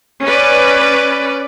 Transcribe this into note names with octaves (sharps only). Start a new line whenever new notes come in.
C#4 B4 D5